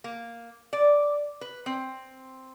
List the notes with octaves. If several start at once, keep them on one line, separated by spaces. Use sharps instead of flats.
A#3
D5
B4
C4